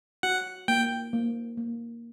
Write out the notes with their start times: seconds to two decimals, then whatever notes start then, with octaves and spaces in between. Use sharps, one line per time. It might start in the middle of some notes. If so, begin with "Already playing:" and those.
0.23 F#4 F#5
0.68 A#3 G5
1.13 A#3
1.57 A#3